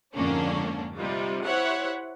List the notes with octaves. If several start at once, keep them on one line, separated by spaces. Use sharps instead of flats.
F2 G#2 D3 A#3 C#4 D4
C3 G3 D#4 F4
E4 G4 C5 C#5 E5 F#5